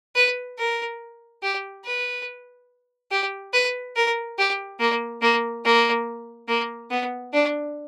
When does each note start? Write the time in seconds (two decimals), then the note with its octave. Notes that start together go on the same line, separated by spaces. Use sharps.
0.15 B4
0.58 A#4
1.43 G4
1.85 B4
3.11 G4
3.53 B4
3.96 A#4
4.38 G4
4.80 A#3
5.22 A#3
5.65 A#3
6.48 A#3
6.91 B3
7.33 D4